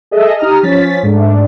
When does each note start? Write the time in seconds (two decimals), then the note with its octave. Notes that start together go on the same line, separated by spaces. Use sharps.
0.11 G#4 A4 D#5 E5
0.39 D#4 G4 A#5 D#6 F6
0.63 F3 C#4 A6 B6
1.03 G#2 A3 D4